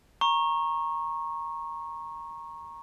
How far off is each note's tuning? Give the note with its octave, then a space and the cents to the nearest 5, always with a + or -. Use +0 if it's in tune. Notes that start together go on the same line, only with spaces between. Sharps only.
A#5 +5 C#6 -20